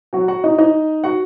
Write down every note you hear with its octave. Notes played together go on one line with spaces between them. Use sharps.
F#3 F#4
F#4 F#5
D#4 D#5
D#4 D#5
F#4 F#5